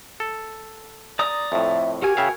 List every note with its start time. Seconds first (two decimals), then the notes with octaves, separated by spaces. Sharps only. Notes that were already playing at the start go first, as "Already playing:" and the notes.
0.20 A4
1.19 D5 A#5 D#6
1.52 F2 A2 E5
2.02 F#4 G4 A#4 G#5
2.17 C#3 E5 F5 G5